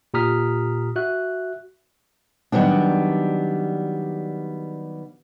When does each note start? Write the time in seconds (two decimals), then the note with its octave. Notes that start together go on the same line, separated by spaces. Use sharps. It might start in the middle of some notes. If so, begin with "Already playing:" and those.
0.14 A#2 G4 A#5 D#6 F6 B6
0.96 F#4 E5 F#6
2.52 D#3 F#3 G3 B3 D4